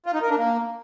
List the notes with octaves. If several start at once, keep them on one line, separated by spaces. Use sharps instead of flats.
F4
D#4
A#4
D4
A#3